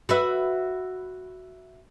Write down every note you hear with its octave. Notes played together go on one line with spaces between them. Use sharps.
F#4 B4 E5